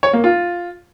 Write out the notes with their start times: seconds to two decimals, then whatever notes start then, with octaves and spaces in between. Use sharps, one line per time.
0.03 C#5
0.13 A#3
0.24 F4